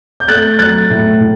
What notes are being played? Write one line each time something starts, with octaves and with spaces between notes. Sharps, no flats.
G6
A3 F#6 A6
F#3 F#6 A6
A2
A2